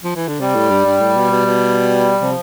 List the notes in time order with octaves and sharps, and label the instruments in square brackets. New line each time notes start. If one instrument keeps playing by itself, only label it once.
[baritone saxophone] F3
E3
D3
[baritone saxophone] C3 [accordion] G3
[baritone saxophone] A2
G2
G2
A2
B2
B2
B2
[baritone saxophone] C3 [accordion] F3